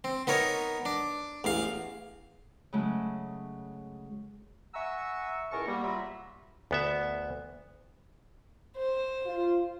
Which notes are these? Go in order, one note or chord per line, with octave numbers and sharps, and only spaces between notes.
C4
B3 D#4 A#4 C#5
D4
A1 E2 F5
C#3 F#3 G#3 A3
E5 F#5 G#5 A#5 C#6 E6
C#2 A2 A#4 G#5 A5 C#6
G3 A#3 B3
F#3 G3 F4 E5 A#5 B5
D2 B3 E5
C5
F4